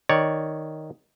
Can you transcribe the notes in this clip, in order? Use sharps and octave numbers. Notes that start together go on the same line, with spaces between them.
D#3 C#5 D5